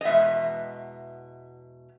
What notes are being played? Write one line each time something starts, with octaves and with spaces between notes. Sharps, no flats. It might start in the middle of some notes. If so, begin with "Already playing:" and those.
D#5
E2 B2 G#3 E5